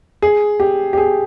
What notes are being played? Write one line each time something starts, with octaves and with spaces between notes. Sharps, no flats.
G#4
G4
G4
G#4